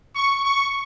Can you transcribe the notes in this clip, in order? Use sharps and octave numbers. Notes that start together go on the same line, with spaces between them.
C#6
C#6